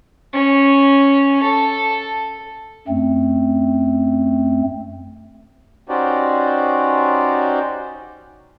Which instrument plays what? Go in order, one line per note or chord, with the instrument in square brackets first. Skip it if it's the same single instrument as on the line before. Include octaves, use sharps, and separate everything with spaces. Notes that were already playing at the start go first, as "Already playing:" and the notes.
[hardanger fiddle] C#4
A4
[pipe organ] F#2 A3 C4
[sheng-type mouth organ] C#4 D#4 F#4 G4 C5 D5